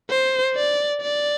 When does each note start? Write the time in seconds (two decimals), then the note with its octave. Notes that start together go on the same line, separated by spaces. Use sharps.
0.10 C5
0.55 D5
1.01 D5